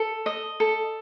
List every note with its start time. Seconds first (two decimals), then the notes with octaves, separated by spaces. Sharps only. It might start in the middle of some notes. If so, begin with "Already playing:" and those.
Already playing: A4
0.26 D#5
0.60 A4